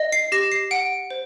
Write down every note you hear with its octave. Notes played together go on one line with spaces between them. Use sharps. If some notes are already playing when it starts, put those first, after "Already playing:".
Already playing: D#5
C7
G4 A#6
C7
F#5 D7
C5